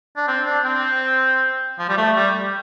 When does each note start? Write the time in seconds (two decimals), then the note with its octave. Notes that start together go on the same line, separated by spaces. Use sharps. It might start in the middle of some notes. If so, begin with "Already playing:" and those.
0.16 D4
0.27 C4
0.45 D4
0.64 C4
1.79 F3
1.88 G3
1.97 A3
2.16 G3